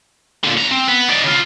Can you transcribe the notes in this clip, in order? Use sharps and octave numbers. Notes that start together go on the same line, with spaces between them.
A#2 D3
B3 A#5
C4
B3
D#4 D5
C#3 F4